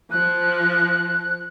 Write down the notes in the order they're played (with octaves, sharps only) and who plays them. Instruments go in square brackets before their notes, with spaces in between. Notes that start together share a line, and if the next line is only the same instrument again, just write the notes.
[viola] F3 [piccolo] F#6